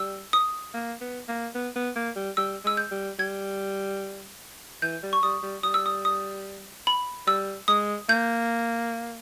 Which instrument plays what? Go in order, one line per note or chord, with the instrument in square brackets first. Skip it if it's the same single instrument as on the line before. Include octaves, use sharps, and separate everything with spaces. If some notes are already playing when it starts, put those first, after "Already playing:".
Already playing: [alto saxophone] G3 [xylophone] E6
[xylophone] D#6
[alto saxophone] A#3
B3
A#3
B3
B3
A#3
G3
[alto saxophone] G3 [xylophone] E6
[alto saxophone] G#3 [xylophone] E6
[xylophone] G6
[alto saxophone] G3
[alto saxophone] G3 [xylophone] G#6
[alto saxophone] E3 [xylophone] G6
[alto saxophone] G3
[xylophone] C#6
[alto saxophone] G3 [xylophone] D#6
[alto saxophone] G3
[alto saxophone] G3 [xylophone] D#6
[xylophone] E6
D#6
D#6
B5
[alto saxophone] G3 [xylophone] E6
[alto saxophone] G#3 [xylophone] D#6
[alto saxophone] A#3 [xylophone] G6